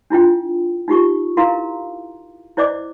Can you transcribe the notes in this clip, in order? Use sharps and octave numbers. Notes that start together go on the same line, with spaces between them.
D4 E4 F4 G5
D#4 F4 G4 C#6
E4 A#4 F5 A#5 C6
E4 C5 D5 D#5 D6